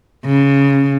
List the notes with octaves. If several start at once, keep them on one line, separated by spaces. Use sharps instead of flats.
C#3